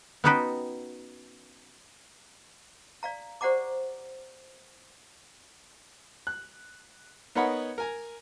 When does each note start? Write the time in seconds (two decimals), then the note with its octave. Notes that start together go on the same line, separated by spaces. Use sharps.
0.24 B3 C#4 D#4 F#4 B4 G5
3.03 D5 F5 A#5
3.41 G4 C5 D5 F#5 A#5 D6
6.27 F#6
7.35 B3 D#4 A#4 C#5 F#5 B5
7.78 A#4 G#5 A#5